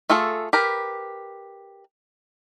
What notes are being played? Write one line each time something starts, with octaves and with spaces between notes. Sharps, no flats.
A3 F4 G#4 A4
G4 A#4 B4